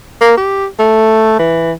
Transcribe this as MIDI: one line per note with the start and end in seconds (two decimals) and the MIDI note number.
0.21 0.34 58
0.38 0.66 67
0.79 1.38 57
1.39 1.73 52